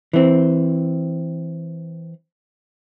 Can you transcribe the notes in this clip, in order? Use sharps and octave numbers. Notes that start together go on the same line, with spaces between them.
E3 C4